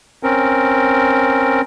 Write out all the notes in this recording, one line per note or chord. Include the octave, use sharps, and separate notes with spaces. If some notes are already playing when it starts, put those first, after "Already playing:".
C4 C#4 A#4